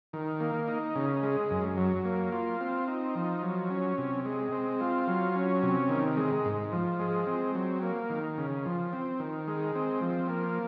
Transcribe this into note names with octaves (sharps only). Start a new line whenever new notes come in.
D#3
A#3
D#4
C#3
G#3
F#2
F#3
A#3
F4
C4
D#4
F3
F#3
C#4
C3
G#3
C4
F4
F#3
C#4
C3
D#3
G#3
G#2
F3
G#3
C4
F#3
A#3
D#3
C#3
F3
C4
D#3
G#3
C4
F3
A#3